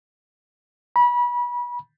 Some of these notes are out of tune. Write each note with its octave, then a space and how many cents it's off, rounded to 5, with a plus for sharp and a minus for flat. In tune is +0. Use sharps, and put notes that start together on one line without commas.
B5 -30